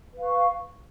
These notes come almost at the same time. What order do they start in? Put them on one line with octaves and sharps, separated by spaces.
B4 F5 C#6